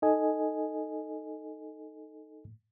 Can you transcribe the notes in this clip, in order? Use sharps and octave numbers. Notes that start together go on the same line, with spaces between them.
D#4 A4 D#5 G#5